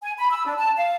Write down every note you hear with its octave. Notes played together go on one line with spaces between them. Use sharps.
G#5
B5
E6
D4
A5
F5